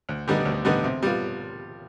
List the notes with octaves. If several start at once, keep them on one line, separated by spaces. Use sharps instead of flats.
D2
D3 G3 B3 D#4
D2
D3 G3 B3 D#4
C3
G3 B3 F4